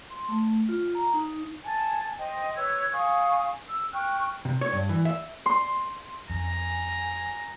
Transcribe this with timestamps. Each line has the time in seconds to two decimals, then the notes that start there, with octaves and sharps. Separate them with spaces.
0.10 C6
0.29 A3
0.69 F4
0.95 A#5
1.14 D#4
1.65 G#5 A5
2.19 C5 D#5 G5
2.56 B4 C#5 E6 G#6
2.93 F5 G#5 C#6 D#6
3.68 E6
3.92 G5 C#6 F6 F#6
4.45 C3
4.61 C#5
4.73 G2
4.89 E3
5.05 E5
5.46 C6
6.30 F2 G#5 A#5